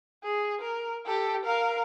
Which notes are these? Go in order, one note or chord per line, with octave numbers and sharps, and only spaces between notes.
G#4
A#4
G4 A4
A#4 F5